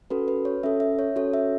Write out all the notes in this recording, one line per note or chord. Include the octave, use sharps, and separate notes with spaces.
C#4 F#4 A4 B4
B4
C#5
C#4 A4 E5
E5
C#5
C#4 F#4 A4 C#5
E5